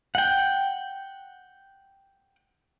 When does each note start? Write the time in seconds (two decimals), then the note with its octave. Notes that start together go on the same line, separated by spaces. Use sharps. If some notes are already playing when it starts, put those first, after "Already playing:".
0.15 F#5 G5